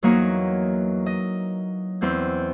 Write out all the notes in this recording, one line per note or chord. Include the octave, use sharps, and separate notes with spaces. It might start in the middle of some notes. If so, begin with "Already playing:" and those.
E2 F#3 A#3 D#4 C#5 D#5
D#5
E2 C4 G6